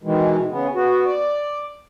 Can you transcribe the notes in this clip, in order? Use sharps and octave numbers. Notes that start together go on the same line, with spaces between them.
B2 D#3 E3 G#3
C#3 B3
B3 F#4
D5